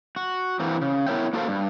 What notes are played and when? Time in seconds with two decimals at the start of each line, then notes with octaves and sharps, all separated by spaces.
0.16 F#4
0.60 E3 A#3 C4
0.81 C#3
1.07 B3 E4 A#4 C#5 E5 G5
1.33 A#3 F#4 A4 B4 C5 F5
1.48 G2